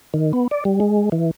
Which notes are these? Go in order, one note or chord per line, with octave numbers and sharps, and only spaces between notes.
D#3
B3
D5
G3
G#3
E3